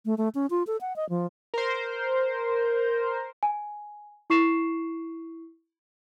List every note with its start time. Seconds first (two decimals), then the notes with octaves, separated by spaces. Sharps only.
0.05 A3
0.18 A3
0.35 C#4
0.50 F4
0.67 A4
0.81 F#5
0.96 D#5
1.09 F3
1.54 A#4 C5
3.43 G#5
4.30 E4 C#6 C7 E7